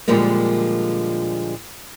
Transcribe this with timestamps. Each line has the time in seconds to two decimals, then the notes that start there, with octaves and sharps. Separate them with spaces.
0.08 A#2 D3 F3 G3 G#3 A#3